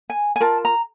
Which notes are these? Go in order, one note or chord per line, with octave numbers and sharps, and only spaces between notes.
G#5
G#5
F4 A#4 A5
A#5